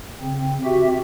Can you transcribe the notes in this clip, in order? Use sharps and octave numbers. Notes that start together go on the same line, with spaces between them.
C#3 C4
C4 F#4 G4 E5